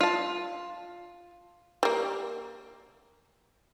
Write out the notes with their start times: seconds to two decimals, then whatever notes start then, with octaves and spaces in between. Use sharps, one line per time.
0.01 F4 A5
1.83 G3 A#3